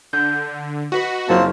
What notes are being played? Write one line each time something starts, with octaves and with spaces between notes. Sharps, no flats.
D3 G6
F#4 B4 D#5
F#1 A#3 C4 F4 A5